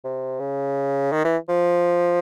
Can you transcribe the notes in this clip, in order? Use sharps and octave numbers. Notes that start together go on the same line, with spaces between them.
C3
C#3
D#3
E3
F3